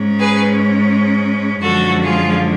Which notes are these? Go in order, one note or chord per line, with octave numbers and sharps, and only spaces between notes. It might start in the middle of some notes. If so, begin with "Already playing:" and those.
Already playing: G#2 G#3 C#4
G#4 B4
F#2 D3 F3 G#3 F#4 A4
F4 G#4